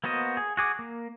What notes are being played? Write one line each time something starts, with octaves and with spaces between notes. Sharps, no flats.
A#3 B3 F#4 C5 D#5
G#4
F#4 G#4 D6
A#3